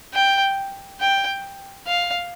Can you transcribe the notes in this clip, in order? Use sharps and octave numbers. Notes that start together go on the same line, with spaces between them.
G5
G5
F5